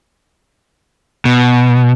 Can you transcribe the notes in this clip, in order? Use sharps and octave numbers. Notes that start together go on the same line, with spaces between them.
B2